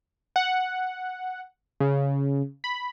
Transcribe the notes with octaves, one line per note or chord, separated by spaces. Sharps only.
F#5
C#3
B5